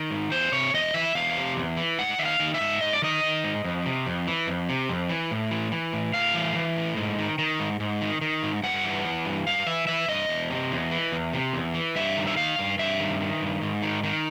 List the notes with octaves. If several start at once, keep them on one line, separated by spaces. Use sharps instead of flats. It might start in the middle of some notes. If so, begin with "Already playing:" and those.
Already playing: D#3
G#2
E2 C5
C3 C#5
E2 D#5
E3 E5
E2 F5
C3
E2
E3
G#2 F#5
D#3 E5
F5
D#3
E5
G#2
G#2 D#5
D5
D#3 D#5
D#3
G#2
F2
C3
F2
E3
F2
C3
F2
E3
A2
E3
E3
A2
A2 F5
E3
E3
A2
G#2
D#3
D#3
G#2
G#2
D#3
D#3
G#2
G2 F#5
E3
E3
G2
G2 F5
E3 E5
E3 E5
G2 D#5
E2
C3
E2
E3
E2
C3
E2
E3
G2 E5
D#3
E5
D#3 F5
G2
G2 E5
D#3
D#3
G2
G#2
D#3
D#3